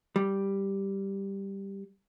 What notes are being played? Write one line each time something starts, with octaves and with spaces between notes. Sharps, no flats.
G3